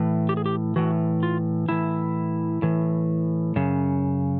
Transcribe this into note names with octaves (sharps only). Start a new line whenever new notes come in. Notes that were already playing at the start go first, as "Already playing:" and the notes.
Already playing: A2 E3
G4
G#4
G4
A2 E3 F#4
F4
A2 E3 E4
A2 E3
F#2 C#3